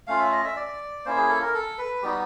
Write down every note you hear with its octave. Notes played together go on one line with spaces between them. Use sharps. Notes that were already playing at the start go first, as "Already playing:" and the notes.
A3 C#4 F4 F5
E5
D#5
E5
D5
A#3 C#4 E4 C5
G#4
A4
A#4
A4
B4
G3 B3 D#4 F#4 G4